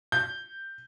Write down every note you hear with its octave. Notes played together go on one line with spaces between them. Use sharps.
G6